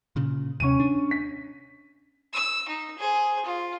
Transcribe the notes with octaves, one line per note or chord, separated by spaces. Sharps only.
A#2 C#3
D#2 C3 C#4 C#6 D#7
D4
B6
E6
D#4
G#4 C5
F4